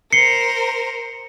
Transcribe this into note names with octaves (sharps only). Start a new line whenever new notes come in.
A#4 C5 C7 C#7 G7